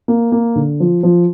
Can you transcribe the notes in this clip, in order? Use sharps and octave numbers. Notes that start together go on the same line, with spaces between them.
A#3
A#3
D3
F3
F3